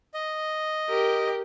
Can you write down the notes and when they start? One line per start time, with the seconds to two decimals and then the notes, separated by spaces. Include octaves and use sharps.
0.14 D#5
0.89 G4 A#4